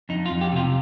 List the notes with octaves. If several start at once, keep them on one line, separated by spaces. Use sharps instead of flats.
F2 D#4
F4
F2
G4
C3 F4